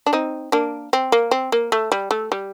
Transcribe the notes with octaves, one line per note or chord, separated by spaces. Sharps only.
D4
C4 D#4
A#3 D4
C4
A#3
C4
A#3
A3
G3
A3
G3